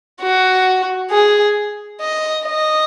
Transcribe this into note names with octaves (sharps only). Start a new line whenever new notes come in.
F#4
G#4
D#5
D#5